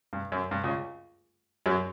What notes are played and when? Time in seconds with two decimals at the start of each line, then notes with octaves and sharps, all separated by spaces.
0.13 G2
0.32 F#2
0.51 G2
0.64 C#2 C#3
1.66 F#2 F#3